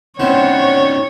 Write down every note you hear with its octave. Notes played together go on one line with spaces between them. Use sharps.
C4 C#4 D#4 E4 C5 C#5 F#5